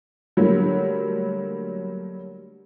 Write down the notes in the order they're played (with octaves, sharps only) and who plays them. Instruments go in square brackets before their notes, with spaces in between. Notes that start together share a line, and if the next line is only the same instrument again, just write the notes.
[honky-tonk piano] D3 F#3 G3 A3 A#3